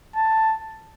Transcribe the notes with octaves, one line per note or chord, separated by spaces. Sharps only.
A5